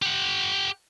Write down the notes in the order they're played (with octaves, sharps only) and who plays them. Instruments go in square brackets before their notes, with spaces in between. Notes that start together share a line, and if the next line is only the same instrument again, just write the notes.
[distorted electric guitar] G4 F#5